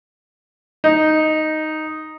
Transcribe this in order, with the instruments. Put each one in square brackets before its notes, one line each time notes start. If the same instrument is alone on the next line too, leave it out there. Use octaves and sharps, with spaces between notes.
[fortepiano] D#4